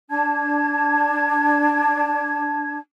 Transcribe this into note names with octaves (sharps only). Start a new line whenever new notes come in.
D4 A5 G#6